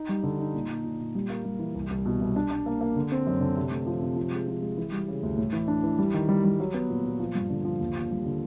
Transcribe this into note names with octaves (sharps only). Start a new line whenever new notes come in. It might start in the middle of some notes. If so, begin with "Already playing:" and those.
Already playing: D#4
G3
D3
D#4
A#2
A#2
A#2
A#2
G3
A#3
G3
E3
C2
C2
B2
C2
D4
D4
A#3
A#3
D3
C4
F#2
D3
C3
A3
F3
C3
F3
G#3
F3
G#3
E3
G3
C#3
D2
A2
E3
D4
E3
G3
D#3
G3
G3
F#3
B3
A#2
A#2
F3
G2
D3
F3
D#2
D#2
G3
D3